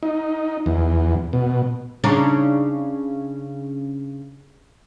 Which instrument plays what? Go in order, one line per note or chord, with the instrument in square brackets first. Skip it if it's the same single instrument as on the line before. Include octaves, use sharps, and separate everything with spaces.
[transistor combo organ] D#4
E2
B2
[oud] C#3 D4 D#4